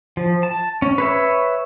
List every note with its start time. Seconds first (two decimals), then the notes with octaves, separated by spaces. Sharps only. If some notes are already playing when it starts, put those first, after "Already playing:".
0.17 F3
0.43 A5
0.82 C#4
0.98 B4 C#5 E5